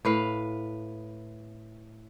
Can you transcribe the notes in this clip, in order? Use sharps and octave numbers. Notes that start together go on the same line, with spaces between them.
A2 B4 F5